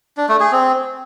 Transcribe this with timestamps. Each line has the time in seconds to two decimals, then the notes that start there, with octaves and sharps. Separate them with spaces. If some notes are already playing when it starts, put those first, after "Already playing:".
0.17 D4
0.29 A3
0.40 G#4
0.52 C4